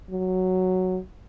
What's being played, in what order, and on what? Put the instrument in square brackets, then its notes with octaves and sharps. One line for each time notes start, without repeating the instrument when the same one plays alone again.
[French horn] F#3